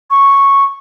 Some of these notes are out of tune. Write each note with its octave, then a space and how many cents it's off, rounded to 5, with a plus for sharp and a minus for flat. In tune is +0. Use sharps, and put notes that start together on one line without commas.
C#6 -5